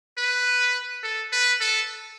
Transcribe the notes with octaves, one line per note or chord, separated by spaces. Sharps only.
B4
A4
B4
A4